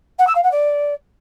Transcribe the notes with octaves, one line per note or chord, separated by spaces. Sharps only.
F#5
E6
F5
F#5
D5